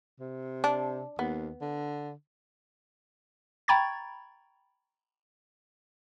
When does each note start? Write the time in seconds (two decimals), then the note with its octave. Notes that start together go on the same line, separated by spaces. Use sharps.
0.20 C3
0.64 D4
1.19 D#2 B3
1.61 D3
3.68 G5 A#5 B5 C#6 G#6 A6